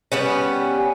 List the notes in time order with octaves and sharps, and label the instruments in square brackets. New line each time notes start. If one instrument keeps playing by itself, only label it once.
[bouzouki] G3 B3 C#4